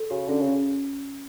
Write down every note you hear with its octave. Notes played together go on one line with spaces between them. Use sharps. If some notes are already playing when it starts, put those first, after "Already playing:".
Already playing: A4
C#3 F#4
D3 C#4
C#3
C#4